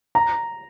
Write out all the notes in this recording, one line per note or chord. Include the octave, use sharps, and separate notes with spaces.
A#5